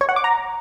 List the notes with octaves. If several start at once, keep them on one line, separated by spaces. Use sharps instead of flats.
C#5
F#5
D6
A#5